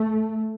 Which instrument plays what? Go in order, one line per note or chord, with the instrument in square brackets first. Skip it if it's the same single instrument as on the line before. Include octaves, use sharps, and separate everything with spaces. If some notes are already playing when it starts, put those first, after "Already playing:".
Already playing: [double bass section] A3